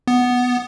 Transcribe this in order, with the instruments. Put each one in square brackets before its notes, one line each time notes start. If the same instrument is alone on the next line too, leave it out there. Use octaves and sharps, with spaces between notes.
[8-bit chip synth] B3